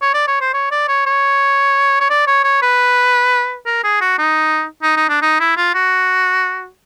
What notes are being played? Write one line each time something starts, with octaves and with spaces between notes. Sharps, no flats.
C#5
D5
C#5
C5
C#5
D5
C#5
C#5
C#5
D5
C#5
C#5
B4
A#4
G#4
F#4
D#4
D#4
D#4
D4
D#4
E4
F4
F#4